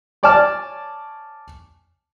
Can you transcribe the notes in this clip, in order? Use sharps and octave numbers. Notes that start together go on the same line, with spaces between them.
C#5 D5 G#5 A5 F6